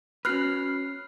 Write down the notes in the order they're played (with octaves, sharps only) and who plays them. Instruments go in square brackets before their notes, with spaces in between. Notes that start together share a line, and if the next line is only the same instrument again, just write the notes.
[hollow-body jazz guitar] C#4 F#4 B4 [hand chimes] F6 F#6 C7